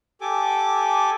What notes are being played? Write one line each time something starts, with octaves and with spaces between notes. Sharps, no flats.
G4 A4 G#5 D6